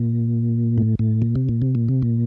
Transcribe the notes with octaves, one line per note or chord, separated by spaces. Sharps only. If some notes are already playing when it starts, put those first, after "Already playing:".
Already playing: A#2
A2
A2
A#2
C3
A#2
C3
A#2
C3
A#2